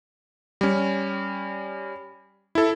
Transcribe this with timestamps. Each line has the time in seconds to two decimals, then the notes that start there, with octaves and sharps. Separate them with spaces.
0.61 G3 C#4
2.55 E4 A4